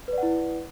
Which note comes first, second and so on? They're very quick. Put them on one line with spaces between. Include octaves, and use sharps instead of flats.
B4 D5 F#5 E4